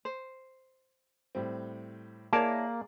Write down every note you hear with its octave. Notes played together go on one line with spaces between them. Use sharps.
C5
A2 G3 C4
A#3 E4 G#4 A#4 C#5 D5 A5